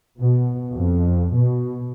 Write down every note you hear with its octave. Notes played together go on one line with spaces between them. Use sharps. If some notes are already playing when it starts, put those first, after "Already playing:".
B2
F2
B2